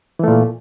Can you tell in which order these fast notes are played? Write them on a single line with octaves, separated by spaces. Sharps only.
E3 A3 A#2